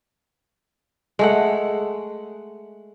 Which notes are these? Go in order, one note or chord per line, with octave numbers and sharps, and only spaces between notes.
G#3 A3 F#5